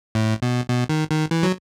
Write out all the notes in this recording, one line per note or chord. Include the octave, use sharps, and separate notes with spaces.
A2
B2
B2
D#3
D#3
E3
F#3